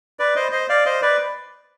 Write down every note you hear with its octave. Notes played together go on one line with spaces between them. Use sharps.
B4 D5
C5 D#5
C5 D#5
D5 F5
C5 D#5
B4 D5